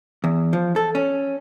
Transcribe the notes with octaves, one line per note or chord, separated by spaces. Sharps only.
E2
F3
A4
C#4